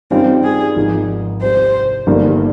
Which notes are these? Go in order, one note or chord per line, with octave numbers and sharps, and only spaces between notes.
G2 D#3 G3 C4 C#4 F4
G#4
G#1 G#2 F3 G#3
C2 C3 G3 C5
G1 G2 D#3 G3 A#3